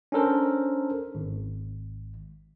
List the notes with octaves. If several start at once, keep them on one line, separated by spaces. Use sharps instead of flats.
C#4 D4 A4 A#4 C5
G#1